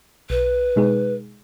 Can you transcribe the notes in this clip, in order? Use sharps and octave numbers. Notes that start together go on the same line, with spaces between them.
B1 B4
B2 G#3 D#4 G#4